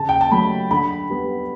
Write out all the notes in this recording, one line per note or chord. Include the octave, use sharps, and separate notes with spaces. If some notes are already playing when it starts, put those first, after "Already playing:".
Already playing: C#3 A5
G5
A5
F#3 A3 B5
D3 B5
G3 B3